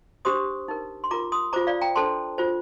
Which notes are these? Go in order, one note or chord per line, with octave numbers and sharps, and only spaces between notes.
D4 G4 C5 C6 D#6
D#4 A#4
C6
F4 A#4 A#5 D6
C6 D#6
F4 C5 A#5 D6
D5 F5
G5 A#5
D4 A4 C5 A5 C6
F4 C5